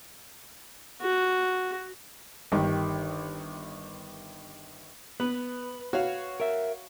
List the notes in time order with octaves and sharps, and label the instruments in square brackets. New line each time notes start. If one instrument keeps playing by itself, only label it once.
[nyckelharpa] F#4
[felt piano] G1 D#3 G4
[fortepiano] B3 [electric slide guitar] B4
[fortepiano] F#4 C#5 F5
[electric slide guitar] A#4 E5